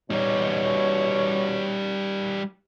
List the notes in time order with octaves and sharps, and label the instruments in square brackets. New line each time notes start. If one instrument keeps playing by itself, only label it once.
[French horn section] B2 C#5 [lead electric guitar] G3 D#4